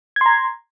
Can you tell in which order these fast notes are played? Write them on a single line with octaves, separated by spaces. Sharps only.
G#6 C6 A#5